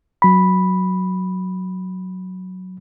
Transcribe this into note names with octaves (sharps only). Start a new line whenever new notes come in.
F#3 B5